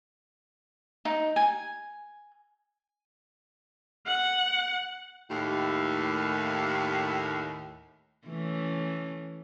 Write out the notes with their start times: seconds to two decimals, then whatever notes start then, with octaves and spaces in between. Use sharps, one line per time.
1.05 D#4
1.36 G#5
4.06 F#5
5.30 D#2 A2
8.27 E3 A3 C#4